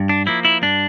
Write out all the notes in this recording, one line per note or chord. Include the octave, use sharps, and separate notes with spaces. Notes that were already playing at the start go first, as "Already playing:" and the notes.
Already playing: G2
D4
F3 A#3 E4
E4
G2 D4